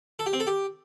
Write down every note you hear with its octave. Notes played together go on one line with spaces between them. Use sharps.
A4
G4
C4
A4
G4